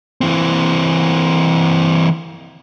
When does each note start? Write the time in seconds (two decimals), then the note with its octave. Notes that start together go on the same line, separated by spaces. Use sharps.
0.21 E3 C4